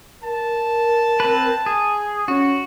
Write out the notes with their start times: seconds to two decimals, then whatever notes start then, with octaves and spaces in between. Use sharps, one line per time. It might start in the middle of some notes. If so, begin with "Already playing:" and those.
0.23 A#4 A5
1.20 C4 B4
1.66 G#4
2.28 C#4 F#4